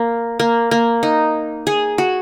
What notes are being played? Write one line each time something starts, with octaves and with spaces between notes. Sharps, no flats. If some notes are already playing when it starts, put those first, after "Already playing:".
Already playing: A#3
A#3
A#3
D#4
G#4
F#4